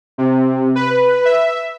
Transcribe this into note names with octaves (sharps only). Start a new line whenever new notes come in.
C3
B4
E5